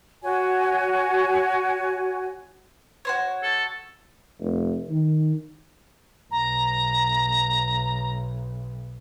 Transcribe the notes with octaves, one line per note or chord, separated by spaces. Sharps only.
F#4 C#5 G#5
F#4 C5 C#5
A4
F1
D#3
B1 A#5